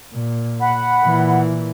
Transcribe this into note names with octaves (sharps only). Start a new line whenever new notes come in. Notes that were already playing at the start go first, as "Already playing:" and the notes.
A#2
F#5 B5
A#2 E3